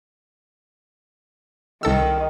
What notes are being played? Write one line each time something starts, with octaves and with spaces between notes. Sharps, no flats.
C2 D#3 A4 E6